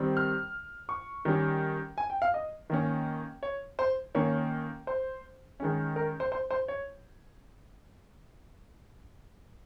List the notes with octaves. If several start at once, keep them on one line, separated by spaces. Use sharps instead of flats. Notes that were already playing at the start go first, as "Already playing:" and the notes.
Already playing: D#3 G3 C4
F6
C#6
D#3 G3 C#4
G#5
G5
F5
D#5
D#3 A#3 C#4
C#5
C5
D#3 A#3 C#4 C#5
C5
D#3 G#3 C#4
A#4
C5
C5
C5
C#5